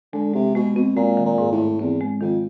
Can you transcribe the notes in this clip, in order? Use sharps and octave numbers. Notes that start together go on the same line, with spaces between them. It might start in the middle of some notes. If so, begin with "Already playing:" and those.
D3 G#3
C3 G#3
B2 G#3
B2 C4
A#2 G#3
D#3
A#2
G#2
A2
G#2
E2 C4
G#3
F2 D#3